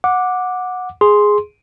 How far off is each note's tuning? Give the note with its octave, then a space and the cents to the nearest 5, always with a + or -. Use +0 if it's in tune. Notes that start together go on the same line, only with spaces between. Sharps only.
F#5 -15 D6 +0
G#4 +0 C6 +0